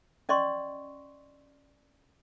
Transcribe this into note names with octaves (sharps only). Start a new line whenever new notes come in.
C#4 D5 D#5 C6 C#6